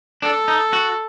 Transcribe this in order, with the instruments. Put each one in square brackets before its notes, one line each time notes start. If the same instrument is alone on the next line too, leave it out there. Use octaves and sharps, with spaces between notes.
[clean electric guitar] D4 [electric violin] A4
[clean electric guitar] D#4
F#4